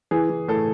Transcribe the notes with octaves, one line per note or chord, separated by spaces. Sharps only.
E3 G#4
E3
A2 A4